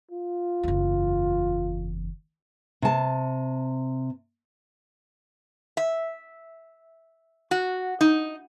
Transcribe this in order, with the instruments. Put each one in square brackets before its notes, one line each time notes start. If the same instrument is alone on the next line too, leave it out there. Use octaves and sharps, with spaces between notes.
[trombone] F4
[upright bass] F#1 E2
[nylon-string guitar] C3 A5
[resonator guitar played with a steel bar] E5
F#4
D#4